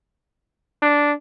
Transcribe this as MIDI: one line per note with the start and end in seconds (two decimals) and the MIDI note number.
0.82 1.13 62